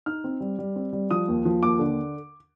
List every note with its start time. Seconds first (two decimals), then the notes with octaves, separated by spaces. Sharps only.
0.06 D#4 F6
0.24 C4
0.40 G3
0.59 G3
0.76 C4
0.93 G3
1.11 F3 D#6
1.28 D#2
1.45 F3
1.62 D#2 D6
1.79 D3